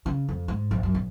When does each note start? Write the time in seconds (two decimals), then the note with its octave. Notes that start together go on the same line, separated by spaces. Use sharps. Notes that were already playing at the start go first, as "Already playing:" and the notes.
0.06 C#3
0.29 F2
0.48 G#2
0.71 A#1
0.83 F#2
0.94 A#1